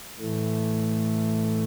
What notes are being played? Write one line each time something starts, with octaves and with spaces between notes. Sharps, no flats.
A2 E3 A3